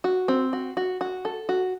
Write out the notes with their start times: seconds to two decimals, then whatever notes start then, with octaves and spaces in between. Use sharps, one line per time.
0.04 F#4
0.28 C4
0.53 F#4
0.77 F#4
1.01 F#4
1.25 A4
1.49 F#4